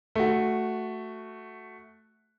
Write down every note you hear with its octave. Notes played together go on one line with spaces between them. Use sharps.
A3 F#4